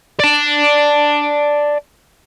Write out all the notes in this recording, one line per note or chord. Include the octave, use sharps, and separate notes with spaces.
D5 A5